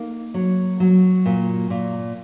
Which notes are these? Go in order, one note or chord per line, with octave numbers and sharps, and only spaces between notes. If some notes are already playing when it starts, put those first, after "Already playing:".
Already playing: A#3 D#4
F#3
F#3
A#2
A#2